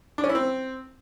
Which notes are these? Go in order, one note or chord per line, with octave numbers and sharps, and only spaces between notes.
D4
C#4
E4
C4